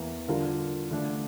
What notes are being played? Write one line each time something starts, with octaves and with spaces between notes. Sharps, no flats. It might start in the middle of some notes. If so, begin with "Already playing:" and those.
Already playing: E2 E3 A#3
D3 G3 D4 F4 A#4
D3 A3 D4